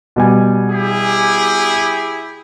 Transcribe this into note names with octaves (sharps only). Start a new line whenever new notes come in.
B2 G3 G#5
E4 G4 G#4